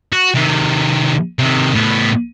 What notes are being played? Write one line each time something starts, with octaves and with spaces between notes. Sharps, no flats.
F#4
C3 D#3
C3 D#3
A2 B3